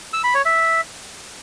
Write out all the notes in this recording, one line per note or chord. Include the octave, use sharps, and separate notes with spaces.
E6
B5
C#5
E5